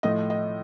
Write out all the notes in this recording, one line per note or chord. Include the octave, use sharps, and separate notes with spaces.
A2 F3 A3 D#5
D#5